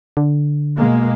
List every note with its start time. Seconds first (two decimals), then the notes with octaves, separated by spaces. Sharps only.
0.17 D3
0.77 B2 G#3 A#3